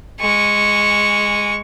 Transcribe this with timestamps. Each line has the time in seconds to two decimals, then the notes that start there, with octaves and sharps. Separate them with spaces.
0.20 G#3 C#6